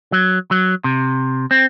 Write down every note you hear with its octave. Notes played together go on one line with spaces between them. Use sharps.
F#3
F#3
C3
C4